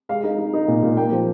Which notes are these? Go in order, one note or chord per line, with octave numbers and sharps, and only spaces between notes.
G#3 F5
D#4
D#4
D#4
A#2
A#2
A#3 G5
F3